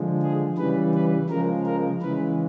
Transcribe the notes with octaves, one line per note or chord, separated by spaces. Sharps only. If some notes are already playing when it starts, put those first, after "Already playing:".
Already playing: D3 F3 G#3
G#4
C#3 E3 G3 B4
B4
C#3 F3 G#3 A#4
A#4
C#3 E3 G#3 B4